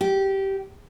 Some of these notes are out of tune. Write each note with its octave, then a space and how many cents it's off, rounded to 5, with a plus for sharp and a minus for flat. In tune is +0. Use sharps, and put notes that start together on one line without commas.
G4 -15